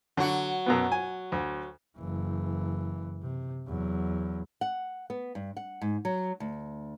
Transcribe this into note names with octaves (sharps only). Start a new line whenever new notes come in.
D3 F#3 F#4
F#2 B2 B3
G#5
D2
F#1 E3
C3
E2 F#3
F#5
B3
G2
F#5
G#2
F#3
D2